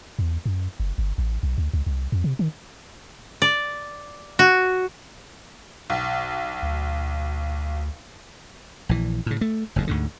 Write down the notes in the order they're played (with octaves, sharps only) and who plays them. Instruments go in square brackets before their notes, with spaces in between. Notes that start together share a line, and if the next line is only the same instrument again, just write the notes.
[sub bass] E2
F#2
F#1
G1
A1
B1
D2
C#2
C2
F2
C3
D#3
[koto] D5
F#4
[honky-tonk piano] B1
[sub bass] D2
[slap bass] A#1 E3
A2 C#3
A3
F#1 E2 G#2
D2 G#2 D3